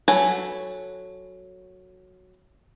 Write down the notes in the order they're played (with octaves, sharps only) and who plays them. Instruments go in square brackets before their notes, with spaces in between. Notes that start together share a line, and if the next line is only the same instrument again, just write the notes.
[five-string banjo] F#3 A4 B4 G#5